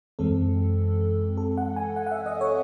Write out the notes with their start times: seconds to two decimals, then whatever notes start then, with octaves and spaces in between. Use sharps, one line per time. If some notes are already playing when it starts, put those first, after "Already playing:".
0.19 F#2 E3 G#3 C4 A4
1.37 A4
1.57 F#5
1.76 G#5
1.96 F#5
2.07 F#5
2.11 E5
2.26 D#5
2.41 C#5